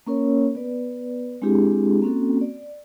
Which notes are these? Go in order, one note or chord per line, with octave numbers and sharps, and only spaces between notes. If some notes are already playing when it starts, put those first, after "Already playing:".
A#3 C#4 A#4 C#5
B3 B4 D5
G#3 C4 D4 E4 G4 G#4
A#3 C4 C#4 F#4 A4
D5